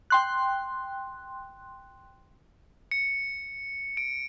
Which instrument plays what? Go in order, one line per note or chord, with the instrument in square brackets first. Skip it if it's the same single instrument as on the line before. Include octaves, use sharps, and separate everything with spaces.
[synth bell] G5 C6 F#6
[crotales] C#7
D7